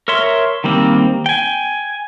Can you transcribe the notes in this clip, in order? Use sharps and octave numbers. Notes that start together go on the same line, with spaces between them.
A#4 C#5 E5 C6
D#3 G3 A#3 C4
G5 G#5